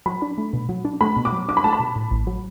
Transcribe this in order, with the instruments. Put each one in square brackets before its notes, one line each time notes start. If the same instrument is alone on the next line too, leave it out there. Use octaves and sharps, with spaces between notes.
[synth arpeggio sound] F#3 [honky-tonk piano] B5
[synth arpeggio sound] D4
A3
B2
F#3
D4
[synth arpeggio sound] A3 [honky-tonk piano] B5
[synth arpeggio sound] B2
[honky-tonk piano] D6
[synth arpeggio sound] F#3
[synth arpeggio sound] D4 [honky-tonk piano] D6
[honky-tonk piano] B5
[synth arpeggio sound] A3 [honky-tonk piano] A5
[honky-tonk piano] B5
[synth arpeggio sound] B2
A2
A1
F#3